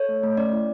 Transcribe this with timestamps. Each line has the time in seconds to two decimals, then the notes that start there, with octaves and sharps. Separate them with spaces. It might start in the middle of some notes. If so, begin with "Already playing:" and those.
Already playing: A4 C#5
0.09 A3
0.23 A3
0.37 C#4 D5
0.53 E4